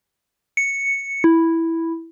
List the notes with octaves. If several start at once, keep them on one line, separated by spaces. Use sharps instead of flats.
C#7
E4